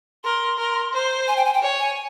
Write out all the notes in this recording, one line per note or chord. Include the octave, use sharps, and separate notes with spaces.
A#4 C6
A#4
C5
G#5
G5
G#5
G5
C#5
G#5